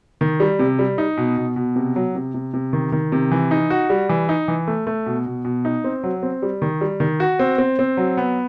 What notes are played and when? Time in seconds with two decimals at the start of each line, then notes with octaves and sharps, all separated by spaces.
0.21 D#3
0.40 G3
0.59 C3
0.79 G3
0.98 D#4
1.17 B2
1.37 B2
1.56 B2
1.76 C3
1.96 F#3
2.15 C3
2.34 C3
2.54 C3
2.73 D#3
2.92 D#3
3.12 C3
3.32 E3
3.51 D#4
3.70 F#4
3.90 G3
4.09 E3
4.29 D#4
4.48 E3
4.68 A3
4.87 A3
5.06 B2
5.26 B2
5.45 B2
5.65 D#4
5.84 C4
6.03 F#3
6.23 C4
6.42 G3
6.62 D#3
6.81 G3
7.00 D#3
7.20 F#4
7.39 C4
7.58 C4
7.79 C4
7.97 F#3
8.17 B3